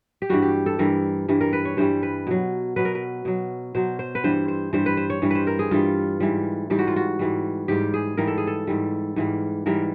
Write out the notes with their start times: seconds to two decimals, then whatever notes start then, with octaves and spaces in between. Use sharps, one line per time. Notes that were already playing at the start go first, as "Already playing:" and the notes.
0.22 G4
0.29 G2 E3 G3 F#4
0.42 G4
0.66 A4
0.79 G2 E3 G3 A#4
1.28 G2 E3 G3
1.41 A#4
1.53 B4
1.65 C#5
1.77 G2 E3 G3 C5
2.03 B4
2.27 B2 F#3
2.76 B2 F#3 B4
2.85 A#4
2.95 B4
3.25 B2 F#3
3.75 B2 F#3 C5
3.99 C5
4.15 B4
4.24 G2 E3 G3 C5
4.48 C5
4.73 G2 E3 G3 C5
4.86 B4
4.97 C5
5.10 C#5
5.22 G2 E3 G3
5.31 B4 C5
5.47 A#4
5.59 G#4
5.71 G2 E3 G3 F4
6.20 G#2 E3 G3
6.70 G#2 E3 G3 G4
6.79 F#4
6.87 F4
6.96 F#4
7.19 G#2 E3 G3
7.68 G#2 E3 G3 G4
7.94 G#4
8.17 G#2 E3 G3 A#4
8.27 A4
8.38 G#4
8.47 A4
8.67 G#2 E3 G3
9.16 G#2 E3 G3
9.66 G#2 E3 G3 A#4